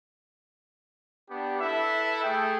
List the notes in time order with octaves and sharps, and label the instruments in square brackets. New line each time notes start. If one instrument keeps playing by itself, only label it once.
[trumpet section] B3 D4 G4
E4 A4 B4 E5
A3 G#4 A4 G5